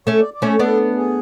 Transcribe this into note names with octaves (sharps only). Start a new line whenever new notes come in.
A3 C#4 C#5
D5
D5
A3 C#4 C#5
B3 D4 A4
G#4